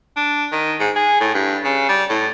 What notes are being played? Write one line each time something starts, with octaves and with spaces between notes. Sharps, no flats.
D4
D#3
G#2
G#4
A2
G2
C#3
G3
A2